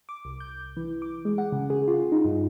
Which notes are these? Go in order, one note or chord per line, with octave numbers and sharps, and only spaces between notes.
D6
C2
G6
E3
D6
G#3
F#5
C#3
G#4
F4
D#4
G2